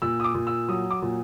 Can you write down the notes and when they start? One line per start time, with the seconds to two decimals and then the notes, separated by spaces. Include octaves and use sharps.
0.02 A#2 E6
0.20 D#6
0.24 D6
0.34 A#2
0.47 E6
0.69 F#3 D#6
0.91 D6
1.02 A#2